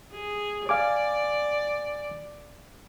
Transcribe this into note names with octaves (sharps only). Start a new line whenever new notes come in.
G#4
D5 F5 G#5 D6